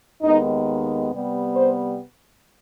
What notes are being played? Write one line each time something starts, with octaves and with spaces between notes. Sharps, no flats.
D#2 D#3 G#3 B3 D#4
C3 G3 B3
C5